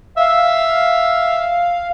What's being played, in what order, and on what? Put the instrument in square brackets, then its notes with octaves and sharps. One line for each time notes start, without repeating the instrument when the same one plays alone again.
[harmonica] E5 [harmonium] F5